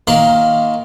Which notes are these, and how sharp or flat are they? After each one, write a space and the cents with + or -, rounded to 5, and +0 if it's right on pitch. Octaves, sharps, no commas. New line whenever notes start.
D#3 +15 A#3 +0 C6 -15